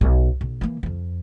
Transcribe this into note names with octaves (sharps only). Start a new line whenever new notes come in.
B1
B1
E3 A#3
F2 F3